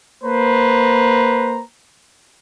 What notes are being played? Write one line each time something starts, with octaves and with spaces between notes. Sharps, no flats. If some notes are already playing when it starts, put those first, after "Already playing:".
A#3 B4 C5 A#5